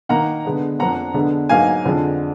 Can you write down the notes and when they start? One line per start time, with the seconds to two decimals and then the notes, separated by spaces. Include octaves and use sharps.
0.09 D#3 A#3 D#4 F#5 A#5
0.45 D3 G#3 B3 D4
0.79 F2 F3 A#3 D4 F#5 A#5
1.14 D3 G#3 B3 D4
1.49 G#2 F#3 A#3 D#4 F5 G#5
1.85 F2 D3 G#3 D4